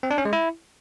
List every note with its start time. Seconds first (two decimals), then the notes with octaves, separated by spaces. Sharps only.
0.03 C4
0.11 D4
0.18 C#4
0.25 G#3
0.33 E4